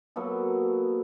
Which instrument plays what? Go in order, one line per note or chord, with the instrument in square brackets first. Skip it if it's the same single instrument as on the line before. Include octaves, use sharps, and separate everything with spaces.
[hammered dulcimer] F#3 A#3 B3 A4